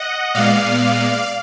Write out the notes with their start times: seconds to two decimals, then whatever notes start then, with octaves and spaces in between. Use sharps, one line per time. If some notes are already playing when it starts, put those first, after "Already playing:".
Already playing: D#5 F#5
0.34 A#2 G#3 B3 D5 F5